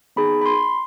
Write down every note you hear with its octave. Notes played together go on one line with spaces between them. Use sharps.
B3 D#4 G#4 B5
B5
C6